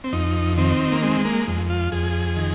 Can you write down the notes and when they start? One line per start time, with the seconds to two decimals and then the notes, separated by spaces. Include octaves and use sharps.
0.04 C4
0.13 F2 D#4
0.57 D#3 C4
0.92 A#3
1.02 G#3 C4
1.25 A#3
1.47 F2
1.70 F4
1.92 F2 G#4
2.37 D#3